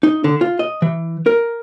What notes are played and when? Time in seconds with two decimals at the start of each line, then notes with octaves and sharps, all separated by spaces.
0.03 D#4
0.24 D3
0.41 F4
0.59 D#5
0.82 E3
1.26 A#4